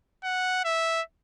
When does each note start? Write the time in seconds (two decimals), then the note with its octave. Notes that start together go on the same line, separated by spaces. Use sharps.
0.24 F#5
0.65 E5